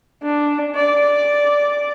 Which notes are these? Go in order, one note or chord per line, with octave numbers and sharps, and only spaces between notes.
D4
D5